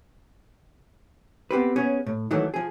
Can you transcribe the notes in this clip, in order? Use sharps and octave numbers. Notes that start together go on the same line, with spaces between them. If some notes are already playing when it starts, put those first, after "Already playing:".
B3 C4 G4 B4
B3 C#4 G#4 C#5
A2
D#3 E3 F#3 A3 D4
F3 G#4